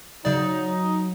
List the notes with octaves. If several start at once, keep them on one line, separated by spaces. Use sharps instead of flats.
C#3 F#3 D#4 D5